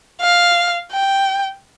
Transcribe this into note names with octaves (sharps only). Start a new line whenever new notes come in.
F5
G5